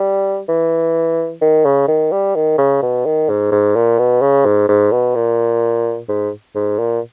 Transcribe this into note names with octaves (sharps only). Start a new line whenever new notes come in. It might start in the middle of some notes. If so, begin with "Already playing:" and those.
Already playing: G3
E3
D#3
C#3
D#3
G3
D#3
C#3
B2
D#3
G#2
G#2
A#2
B2
C#3
G#2
G#2
B2
A#2
G#2
G#2
A#2